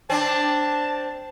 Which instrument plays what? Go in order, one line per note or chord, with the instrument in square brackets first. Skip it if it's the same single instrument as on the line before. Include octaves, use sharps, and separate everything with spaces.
[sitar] C4 D4 [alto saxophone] A5